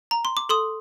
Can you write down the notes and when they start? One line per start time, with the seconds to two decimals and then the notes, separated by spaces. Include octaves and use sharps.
0.11 A#5
0.25 C6
0.37 D6
0.49 A4 C6 D#6